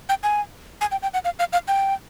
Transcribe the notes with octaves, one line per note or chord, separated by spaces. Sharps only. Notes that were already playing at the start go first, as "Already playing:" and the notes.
G5
G#5
G#5
G5
G5
F#5
F5
F5
F5
G5